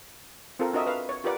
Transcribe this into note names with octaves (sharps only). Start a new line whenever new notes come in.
C4 F4 A4 A#4
D4 F#4 A#4 D#5 E5
B4 F5
C#5
F4 G4 A#4 B4 D5 F#5